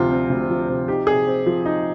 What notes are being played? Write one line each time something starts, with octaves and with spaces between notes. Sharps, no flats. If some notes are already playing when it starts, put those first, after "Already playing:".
Already playing: D2 C3 F3 F4
C4
D2
F3
C3
D#4 G4
C3 G#4
C4
F3
D#4